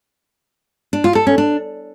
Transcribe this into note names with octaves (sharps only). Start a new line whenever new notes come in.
D4
F4
A4
C#4
D4